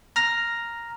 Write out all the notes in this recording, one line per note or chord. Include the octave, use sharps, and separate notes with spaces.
A#5 F6 A#6